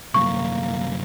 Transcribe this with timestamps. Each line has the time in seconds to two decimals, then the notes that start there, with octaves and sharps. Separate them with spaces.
0.14 C2 F#2 A#3 C#6